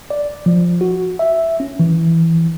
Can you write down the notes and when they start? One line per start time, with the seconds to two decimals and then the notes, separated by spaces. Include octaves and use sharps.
0.10 D5
0.46 F3
0.81 F#4
1.19 E5
1.60 C#4
1.79 E3